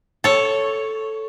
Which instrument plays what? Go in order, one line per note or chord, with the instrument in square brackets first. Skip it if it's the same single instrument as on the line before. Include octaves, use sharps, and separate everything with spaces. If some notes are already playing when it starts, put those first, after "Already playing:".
[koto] A4 C#5